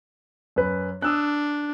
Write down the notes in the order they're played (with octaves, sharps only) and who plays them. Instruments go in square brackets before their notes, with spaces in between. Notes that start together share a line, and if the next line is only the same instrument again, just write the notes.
[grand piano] F#2 B4
[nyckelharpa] D4 [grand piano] D#6 E6 F#6